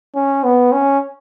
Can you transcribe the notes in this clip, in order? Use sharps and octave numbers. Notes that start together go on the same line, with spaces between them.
C#4
B3
C#4